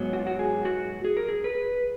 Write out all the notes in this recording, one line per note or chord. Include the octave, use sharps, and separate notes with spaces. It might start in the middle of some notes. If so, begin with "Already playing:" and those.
Already playing: G#2 F#3 B3
F#4
F4
F#4
G#4
F#4
G#4
A#4
G#4
B4